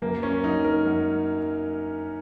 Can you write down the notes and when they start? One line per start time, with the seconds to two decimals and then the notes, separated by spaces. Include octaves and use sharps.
0.02 F#2 A#3
0.23 C#4
0.43 F#2 D#4
0.64 A#4
0.85 F#2